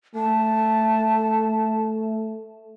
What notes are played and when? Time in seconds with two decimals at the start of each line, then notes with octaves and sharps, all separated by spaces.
0.15 A3 A5